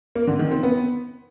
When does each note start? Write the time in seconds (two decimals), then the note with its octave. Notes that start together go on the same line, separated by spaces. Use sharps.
0.15 A#3
0.27 D3
0.39 D#3
0.51 C4
0.63 B3